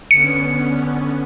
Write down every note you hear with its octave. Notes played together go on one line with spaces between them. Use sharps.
D3 B3 C#4 C#7